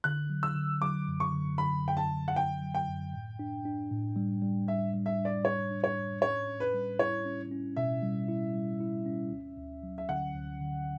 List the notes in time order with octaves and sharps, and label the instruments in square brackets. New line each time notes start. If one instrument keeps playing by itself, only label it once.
[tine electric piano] D3 [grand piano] F#6
[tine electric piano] F#3
[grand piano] E6
[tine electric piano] D3
[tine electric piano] F#3 [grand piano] D6
[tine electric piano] F#2
[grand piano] C#6
[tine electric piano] D3
[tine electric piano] D3 [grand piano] B5
[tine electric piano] F#2 [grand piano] G5
[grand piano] A5
[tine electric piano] F#2
[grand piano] F#5
[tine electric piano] D3 [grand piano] G5
[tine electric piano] F#3
[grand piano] G5
[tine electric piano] F#2
A2
D4
D4
A2
G3
G3
[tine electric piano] G3 [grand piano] E5
[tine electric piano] G3
[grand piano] E5
[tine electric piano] D4
[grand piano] D5
[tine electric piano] G3 [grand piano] C#5
[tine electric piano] D4
[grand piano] C#5
[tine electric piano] A2
[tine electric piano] C#4 [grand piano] C#5
[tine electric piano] C#4
[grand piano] B4
[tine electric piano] G3
[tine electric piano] E4 [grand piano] C#5
[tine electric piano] C#4
C#4
[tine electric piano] B2 [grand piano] E5
[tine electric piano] G3
E4
G3
E4
C#4
D2
D2
F#3
[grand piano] E5
[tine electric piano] D3 [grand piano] F#5
[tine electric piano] D2
D3